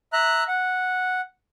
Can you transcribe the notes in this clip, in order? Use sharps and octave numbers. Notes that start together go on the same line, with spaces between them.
E5 A#5 F#6
F#5